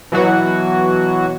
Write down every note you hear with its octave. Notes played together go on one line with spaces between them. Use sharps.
B2 E3 F#3 F#4